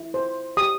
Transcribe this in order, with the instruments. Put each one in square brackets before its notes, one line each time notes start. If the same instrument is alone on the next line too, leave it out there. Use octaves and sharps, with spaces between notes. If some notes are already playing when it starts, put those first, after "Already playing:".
Already playing: [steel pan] E4
C5
G4 D#6